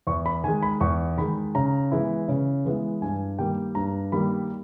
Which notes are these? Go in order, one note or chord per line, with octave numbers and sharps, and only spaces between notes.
E2 C#6
B5
D#3 G#3 G#5
B5
E2 C#6
D#3 G#3 B5
C#3 A#5
E3 G#3 B3 E4
C#3
E3 G#3 B3 E4
G2 G#5
D#3 G3 A#3 G5
G2 A#5
D#3 G3 A#3 B5